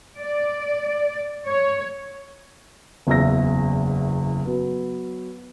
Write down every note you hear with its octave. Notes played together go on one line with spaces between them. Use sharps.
D5
C#5
F#1 E2 E5 F5 E6 A#6
F#3 B3